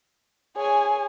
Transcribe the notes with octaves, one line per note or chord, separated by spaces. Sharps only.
G#4 C#5 G#5